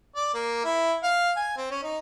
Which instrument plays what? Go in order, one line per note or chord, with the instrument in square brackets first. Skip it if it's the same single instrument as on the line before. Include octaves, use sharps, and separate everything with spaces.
[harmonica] D5
A#3
E4
F5
G#5
C4
C#4
D#4